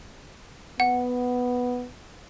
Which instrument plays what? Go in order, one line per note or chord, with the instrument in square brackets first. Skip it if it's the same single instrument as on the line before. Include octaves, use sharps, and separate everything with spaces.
[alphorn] B3 [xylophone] F#5